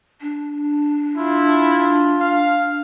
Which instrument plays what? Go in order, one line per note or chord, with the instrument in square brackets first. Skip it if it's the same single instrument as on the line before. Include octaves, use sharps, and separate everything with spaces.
[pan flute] D4
[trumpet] E4 [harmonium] F4
[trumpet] F5